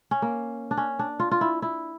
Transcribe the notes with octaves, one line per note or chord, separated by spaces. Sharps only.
C#4
A#3
D4
C#4
D4
F4
F4
E4
E4